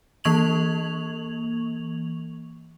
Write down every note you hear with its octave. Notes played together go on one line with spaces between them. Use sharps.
E3 A#3 C#6 G#6 F7 F#7